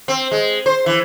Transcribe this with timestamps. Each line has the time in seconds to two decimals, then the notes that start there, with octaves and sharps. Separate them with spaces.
0.08 C4
0.32 G#3
0.66 C5
0.86 E3